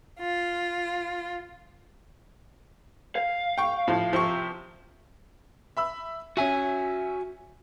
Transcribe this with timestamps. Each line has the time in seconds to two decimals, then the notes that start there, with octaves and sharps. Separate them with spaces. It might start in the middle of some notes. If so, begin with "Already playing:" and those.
0.19 F4
3.16 F5
3.58 G5 C#6
3.88 A2 F3
4.13 C3 F3 C#6
5.77 E5 B5 E6
6.37 C#4 F#4 E5 G#5